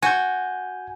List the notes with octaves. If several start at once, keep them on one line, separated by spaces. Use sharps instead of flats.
F#4 G#5 G6